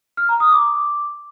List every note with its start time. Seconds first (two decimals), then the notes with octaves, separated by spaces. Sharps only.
0.17 F6
0.29 A#5
0.40 D#6
0.52 D6